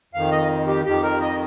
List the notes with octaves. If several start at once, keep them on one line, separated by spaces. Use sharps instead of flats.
F2 D#3 F5
D#5
G4
F2 D#3 G4
A#4
D#5